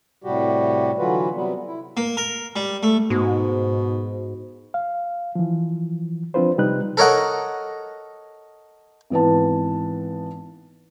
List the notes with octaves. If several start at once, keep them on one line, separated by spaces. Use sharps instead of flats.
A2 C3 G3 F#4 G4
D3 E3 F#3 F4 F#4 B4
C3 F#3 G3 B3
E4
A#3
A#4
G3
A3
G#2 B2
F5
E3 F3
F3 C4 D4 F4 B4 C5
C3 G3 D#4 B4 F#6
A4 A#4 C#5 D#5 F#5
G#1 E3 B3 A5